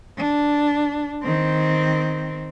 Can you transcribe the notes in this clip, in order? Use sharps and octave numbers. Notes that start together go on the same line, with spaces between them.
D4
D#3 C4